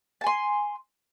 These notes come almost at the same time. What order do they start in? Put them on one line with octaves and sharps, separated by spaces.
A5 G#5 C6